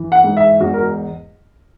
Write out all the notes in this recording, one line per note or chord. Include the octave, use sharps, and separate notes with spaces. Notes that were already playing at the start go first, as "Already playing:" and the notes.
Already playing: E3
F#5
G#2
E5
E2 F#4
A#4